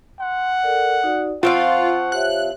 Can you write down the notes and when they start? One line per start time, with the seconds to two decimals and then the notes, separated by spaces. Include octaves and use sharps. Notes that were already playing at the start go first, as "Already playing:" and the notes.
0.20 F#5 C6
0.62 A4 A#4 D5
1.03 D#4 F#4 D5
1.43 F3 C4 F4 F5 F#5 C#6
2.12 G4 C#5 E5 F#6